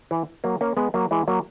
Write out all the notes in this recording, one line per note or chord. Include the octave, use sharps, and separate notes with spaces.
E3
F#3 A#3
A#3 C#4
G#3 B3
F#3 A#3
E3 G#3
F#3 A#3